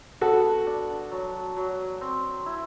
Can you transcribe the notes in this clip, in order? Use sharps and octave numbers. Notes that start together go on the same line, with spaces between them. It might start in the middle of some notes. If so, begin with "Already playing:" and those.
B3 F#4 A4
D4
F#3
F#3
C4
E4